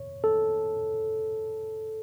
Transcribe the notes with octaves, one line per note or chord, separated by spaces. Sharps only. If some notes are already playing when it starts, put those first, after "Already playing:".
Already playing: C#5
A4